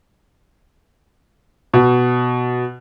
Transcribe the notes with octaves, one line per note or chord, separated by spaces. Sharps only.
B2